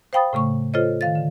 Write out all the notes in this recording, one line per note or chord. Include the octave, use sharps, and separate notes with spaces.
C5 F5 G5 B5 D#6 A6
A2 C#3 A3 C#6
F4 A4 C5 C#5 D#5
D#3 F5 A6
D3